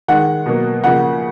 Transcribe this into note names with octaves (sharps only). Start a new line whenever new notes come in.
D#3 G#3 F#5
B2 F#3 A#3
C#3 F3 A#3 F#5